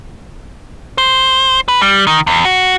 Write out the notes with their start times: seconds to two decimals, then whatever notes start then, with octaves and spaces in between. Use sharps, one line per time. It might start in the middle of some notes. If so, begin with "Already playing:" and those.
0.98 C5
1.68 B4
1.82 G3
2.07 D#3
2.27 E2
2.45 F#4